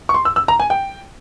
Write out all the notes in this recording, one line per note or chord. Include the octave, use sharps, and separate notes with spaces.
C#6
C6
E6
E6
A#5
G#5
G5